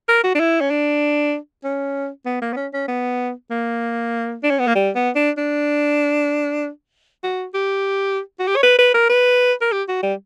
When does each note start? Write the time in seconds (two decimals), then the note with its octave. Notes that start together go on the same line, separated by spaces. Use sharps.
0.09 A#4
0.24 F#4
0.35 D4
0.40 E4
0.61 C#4
0.70 D4
1.64 C#4
2.26 B3
2.42 A#3
2.53 B3
2.57 C#4
2.73 C#4
2.88 B3
3.51 A#3
4.43 D4
4.50 C#4
4.59 B3
4.67 A#3
4.75 G3
4.95 B3
5.16 D4
5.37 D4
7.24 F#4
7.54 G4
8.39 F#4
8.47 G4
8.56 C#5
8.63 B4
8.79 B4
8.94 A#4
9.10 B4
9.61 A#4
9.72 G4
9.88 F#4
10.03 G3